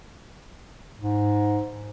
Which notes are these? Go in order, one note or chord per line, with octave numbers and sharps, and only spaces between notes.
G#2